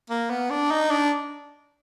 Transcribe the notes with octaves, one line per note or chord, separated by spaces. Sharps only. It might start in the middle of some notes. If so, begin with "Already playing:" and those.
A#3
B3
D4
D#4
D4